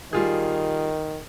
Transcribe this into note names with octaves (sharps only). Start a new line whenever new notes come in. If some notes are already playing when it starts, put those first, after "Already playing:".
D#3 G3 F4 G#4